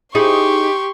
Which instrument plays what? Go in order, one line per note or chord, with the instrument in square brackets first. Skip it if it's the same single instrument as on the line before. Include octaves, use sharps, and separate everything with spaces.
[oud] D#4 E4 G#4 [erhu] G4 [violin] C6 C#6